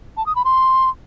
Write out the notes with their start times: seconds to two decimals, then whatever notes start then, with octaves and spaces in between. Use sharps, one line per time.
0.17 A5
0.26 D#6
0.36 B5
0.45 C6